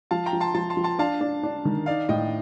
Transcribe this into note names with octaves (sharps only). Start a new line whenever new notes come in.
F3 F5 A5
G5 A#5
F3
A5 C6
F3 A5 C6
A5 C6
F3
A5 C6
D4 F5 A5
D4
D4
D#3
D#4 D5 F5
A2 D#5 G5